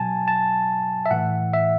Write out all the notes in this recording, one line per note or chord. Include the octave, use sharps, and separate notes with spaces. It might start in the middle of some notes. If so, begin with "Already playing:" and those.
Already playing: B2 F#3 G#5 A5
A5
E5
A2 E3 F#5
E5